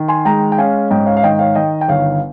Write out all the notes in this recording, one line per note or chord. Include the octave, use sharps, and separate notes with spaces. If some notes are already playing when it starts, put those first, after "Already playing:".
Already playing: D#3
G#5 C6
G#3 G5 A#5
G5
C#4 F5 G#5
G#2 D#5 G5
C#5 F5
F5
D#3 D#5 G5
C#5 F5
D#3 D#5 G5
G5
G1 C#5 F5